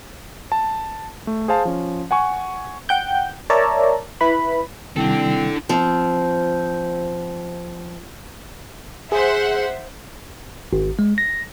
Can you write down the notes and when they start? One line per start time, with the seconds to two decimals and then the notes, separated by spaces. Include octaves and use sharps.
0.52 A5
1.27 A3
1.48 G#4 C5 F5 A5
1.65 F3 C#4
2.11 F#5 G#5 C#6
2.89 F#5 G5 G6
3.50 A#4 C#5 D5 E5 A5 A#5
4.21 E4 B4 B5
4.96 C3 D#3 G3 C4 D4 E4 A4
5.69 F3 C4
9.12 G#4 C5 E5 F#5
10.73 G#1
10.99 G#3
11.18 A#6